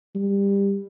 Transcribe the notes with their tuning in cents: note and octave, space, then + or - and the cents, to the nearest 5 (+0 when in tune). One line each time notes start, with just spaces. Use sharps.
G3 +20